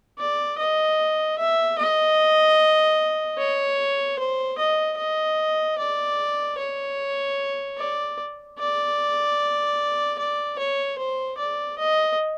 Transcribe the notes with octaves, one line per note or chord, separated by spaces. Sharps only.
D5
D#5
E5
D#5
C#5
C5
D#5
D#5
D5
C#5
D5
D5
D5
C#5
C5
D5
D#5